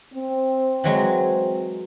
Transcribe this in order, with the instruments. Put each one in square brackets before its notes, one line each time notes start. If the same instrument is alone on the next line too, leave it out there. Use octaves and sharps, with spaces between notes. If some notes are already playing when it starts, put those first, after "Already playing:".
[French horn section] C4
[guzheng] E3 F#3 G#3